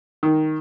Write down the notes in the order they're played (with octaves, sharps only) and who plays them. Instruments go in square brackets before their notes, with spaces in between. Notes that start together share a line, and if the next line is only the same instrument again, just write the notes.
[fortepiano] D#3